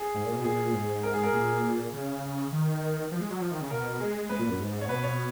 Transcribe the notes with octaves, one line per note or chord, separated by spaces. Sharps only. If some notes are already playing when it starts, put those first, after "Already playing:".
Already playing: G#4
G#2
A#2
B2
A#2 G#4
G#2
A#4
G#4
A#4
A#2 G#4
C#3
D#3
F3
G#3
F#3
F3
D#3
C#3
B2 A#4
G#3
G#3 B4
A#2
F#2
G#2
C#5
B2 B4
C#5